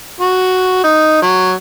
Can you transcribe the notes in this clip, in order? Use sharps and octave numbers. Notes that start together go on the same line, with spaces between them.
F#4
D#4
F#3